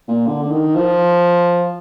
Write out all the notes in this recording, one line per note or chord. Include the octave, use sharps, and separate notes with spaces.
A#2
D3
D3
D#3
F3